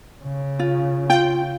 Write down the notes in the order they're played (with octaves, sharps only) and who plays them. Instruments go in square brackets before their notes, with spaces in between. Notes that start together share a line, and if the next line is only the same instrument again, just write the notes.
[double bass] C#3
[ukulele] F4
[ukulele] F4 [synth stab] G5